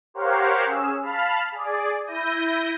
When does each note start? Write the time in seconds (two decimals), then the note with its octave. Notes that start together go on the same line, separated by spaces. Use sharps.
0.14 G4 A#4 C5 C#5 F5 F#5
0.66 C#4 G#4 E6
1.02 F5 A5 B5 F6
1.52 G#4 D5
2.07 E4 G6 A#6 D#7